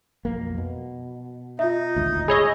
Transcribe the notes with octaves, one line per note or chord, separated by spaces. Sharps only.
B1 F2 A#3
B2
D#4 F4 E5
D#1 G#1 D2
G#4 C#5 D#5 B5 E6